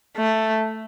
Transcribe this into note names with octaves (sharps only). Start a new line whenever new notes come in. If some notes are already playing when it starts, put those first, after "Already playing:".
A3